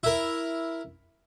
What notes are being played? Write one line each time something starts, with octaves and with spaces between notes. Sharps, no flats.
E4 A#4